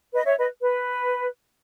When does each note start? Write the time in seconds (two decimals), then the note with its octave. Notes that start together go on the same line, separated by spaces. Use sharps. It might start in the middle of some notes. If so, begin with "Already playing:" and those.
0.13 B4 D#5
0.25 C#5 E5
0.38 B4 D#5
0.61 B4